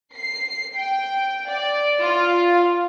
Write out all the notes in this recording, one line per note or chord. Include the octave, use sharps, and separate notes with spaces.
C7
G5
D5
F4